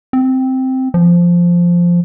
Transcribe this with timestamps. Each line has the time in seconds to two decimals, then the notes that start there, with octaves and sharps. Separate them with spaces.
0.13 C4
0.94 F3